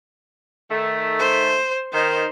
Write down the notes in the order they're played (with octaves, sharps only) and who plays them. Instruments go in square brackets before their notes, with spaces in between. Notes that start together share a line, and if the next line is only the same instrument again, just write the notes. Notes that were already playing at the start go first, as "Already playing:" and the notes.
[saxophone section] D#3 A3
[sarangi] C5
[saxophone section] D#3 [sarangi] C5